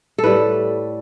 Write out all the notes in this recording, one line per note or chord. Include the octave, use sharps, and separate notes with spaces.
A4
A2 G3 B4